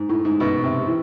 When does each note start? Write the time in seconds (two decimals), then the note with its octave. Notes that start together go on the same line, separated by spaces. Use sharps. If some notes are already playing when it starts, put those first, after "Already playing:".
Already playing: G#2
0.09 A2
0.25 G#2
0.40 B2
0.64 C3
0.87 E3